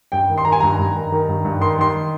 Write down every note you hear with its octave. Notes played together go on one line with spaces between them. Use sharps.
G2 G5
D#3
C6
D#3 A#5
G#5
G2 A#5
G2
D#3
D#3
G2
G2
D#3 C6
D#3 C6